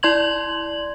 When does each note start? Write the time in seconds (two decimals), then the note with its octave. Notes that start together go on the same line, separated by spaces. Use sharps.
0.03 E4 D5 C6 G#6 F#7